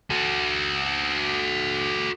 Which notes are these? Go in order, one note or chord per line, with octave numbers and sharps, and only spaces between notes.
F#4 A4